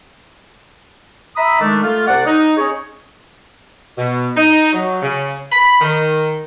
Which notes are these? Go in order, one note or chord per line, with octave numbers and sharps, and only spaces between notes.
E5 A#5 B5 D#6 E6
D#3 G#3 A3 D4
A3 F4
C2 C5 D5 F#5
D#4
C#4 G#4 C#5
B2
D#4
F#3
C#3
B5
D#3